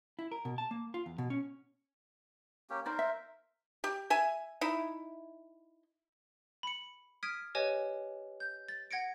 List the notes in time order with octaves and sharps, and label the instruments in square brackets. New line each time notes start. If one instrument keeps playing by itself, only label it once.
[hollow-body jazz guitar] E4
A#4
B2
A5
A#3
F4
E2
B2
C#4
[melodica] A#3 C#4 G4
[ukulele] D#4 D5 [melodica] A#4 C5
[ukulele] E5
[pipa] G4
E5 G#5
D#4 E4
[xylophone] B5 C#7
D#6 F6 G#6 B6 D7 D#7
G4 B4 C#5 D#5 G#5
G6
A6
F#5 G#6 A#6 C#7 D7